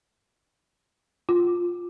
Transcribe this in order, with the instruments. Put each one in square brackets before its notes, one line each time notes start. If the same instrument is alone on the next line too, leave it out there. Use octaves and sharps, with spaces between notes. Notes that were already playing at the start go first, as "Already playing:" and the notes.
[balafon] F4